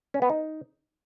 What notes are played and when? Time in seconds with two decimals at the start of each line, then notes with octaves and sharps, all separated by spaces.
0.14 C#4
0.22 B3
0.30 D#4